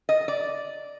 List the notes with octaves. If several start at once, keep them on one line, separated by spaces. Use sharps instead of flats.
D#5
D5